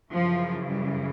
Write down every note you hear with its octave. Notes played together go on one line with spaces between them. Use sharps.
F#2 C#3 E3 F3
G3